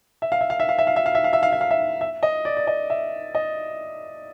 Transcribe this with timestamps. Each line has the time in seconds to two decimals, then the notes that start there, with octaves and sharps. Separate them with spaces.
0.22 E5
0.32 F5
0.41 E5
0.50 F5
0.60 E5
0.69 F5
0.79 E5
0.87 F5
0.96 E5
1.06 F5
1.15 E5
1.24 F5
1.33 E5
1.43 F5
1.53 E5
1.61 F5
1.71 E5
2.01 E5
2.23 D#5
2.45 D5
2.57 D5
2.67 D#5
2.90 E5
3.35 D#5